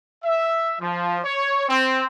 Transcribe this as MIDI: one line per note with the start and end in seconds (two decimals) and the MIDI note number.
0.24 0.75 76
0.81 1.19 53
1.25 1.69 73
1.69 2.05 60